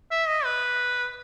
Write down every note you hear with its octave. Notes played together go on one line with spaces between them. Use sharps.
E5
D#5
B4